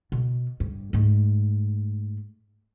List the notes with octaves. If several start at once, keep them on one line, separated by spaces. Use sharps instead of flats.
B2
G2
G#2 A3